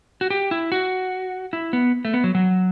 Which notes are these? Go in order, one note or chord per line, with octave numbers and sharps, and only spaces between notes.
F#4
G4
E4
F#4
E4
B3
A3
B3
F#3
F#3